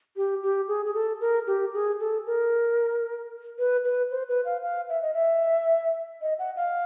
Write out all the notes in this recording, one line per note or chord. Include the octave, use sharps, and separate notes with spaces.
G4
G4
G#4
G#4
A4
A#4
G4
G#4
A4
A#4
B4
B4
C5
B4
F5
F5
E5
D#5
E5
D#5
F#5
F5